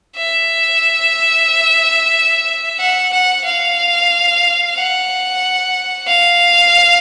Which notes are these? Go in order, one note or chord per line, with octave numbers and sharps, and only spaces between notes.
E5
F#5
F#5
F5
F#5
F5